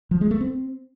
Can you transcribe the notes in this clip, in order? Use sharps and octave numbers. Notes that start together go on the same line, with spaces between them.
F3
G#3
A3
C4